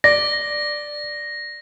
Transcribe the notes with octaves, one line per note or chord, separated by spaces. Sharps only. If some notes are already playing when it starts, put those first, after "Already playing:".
D5 A#6